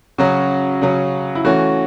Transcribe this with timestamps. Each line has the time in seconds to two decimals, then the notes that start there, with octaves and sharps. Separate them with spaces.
0.18 C#3 F#3 C#4 F#4
0.81 C#3 F#3 C#4
1.35 E4
1.45 E3 A3 C#4 F#4